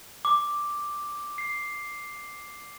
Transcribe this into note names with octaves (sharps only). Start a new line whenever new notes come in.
D6
C7